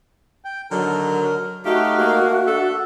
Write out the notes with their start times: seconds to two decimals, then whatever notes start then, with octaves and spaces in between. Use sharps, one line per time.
0.45 G5
0.71 D3 D#3 F#3 A#4
1.65 A3 D#4 F#4 G4 F5
1.99 A#3
2.46 D4 A4 E5